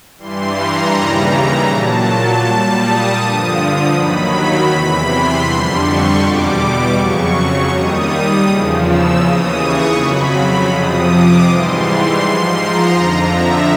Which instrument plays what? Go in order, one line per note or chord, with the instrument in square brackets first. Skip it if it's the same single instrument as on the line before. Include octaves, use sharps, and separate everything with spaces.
[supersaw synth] G2 E3 G3 C6
A#5
D#2 C#3 E3 G3
A#5
A#2 F#3 A5
A#2 G3 A5
D#6
G2 D3 F3
D#2 D#3 F#3 B5
E2 C3 E3 B5
C6
F2 D3 G3
C#6
E2 B2 G3 D6
F2 C#3 F#3 C#6
D#2 D#3 G3 D#6
E2 C#3 F3
E6
D#2 C#3 E3 D#6
C#6
F2 C#3 F#3 B5
B5
F2 C3 F3 D#6
D6
G#2 E3 G3 C6
C6
G#2 F3
A#5
F2 D3 F3
E5